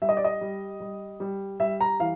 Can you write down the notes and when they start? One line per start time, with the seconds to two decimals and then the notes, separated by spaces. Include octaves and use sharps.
0.02 G3 E5
0.09 D#5
0.17 D5
0.24 D#5
0.41 G3
0.80 G3
1.20 G3
1.60 G3 E5
1.81 A#5
2.00 E3 F5